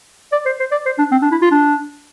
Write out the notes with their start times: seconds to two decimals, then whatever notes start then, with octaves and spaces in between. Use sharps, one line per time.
0.32 D5
0.46 C5
0.60 C5
0.72 D5
0.86 C5
0.98 D4
1.11 C4
1.22 D4
1.32 E4
1.42 F4
1.51 D4